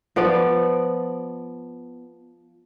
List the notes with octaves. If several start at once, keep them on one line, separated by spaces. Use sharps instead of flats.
F3 B3 D5